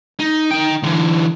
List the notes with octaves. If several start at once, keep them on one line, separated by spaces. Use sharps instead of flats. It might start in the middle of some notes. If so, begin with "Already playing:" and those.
D#4
D#4 G5
D3 E3